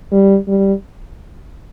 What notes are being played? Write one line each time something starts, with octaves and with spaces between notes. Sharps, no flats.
G3
G3